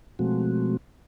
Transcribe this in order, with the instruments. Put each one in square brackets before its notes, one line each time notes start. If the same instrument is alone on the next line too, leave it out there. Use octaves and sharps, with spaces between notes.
[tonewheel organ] B2 F3 G#3 A3 C4 F#4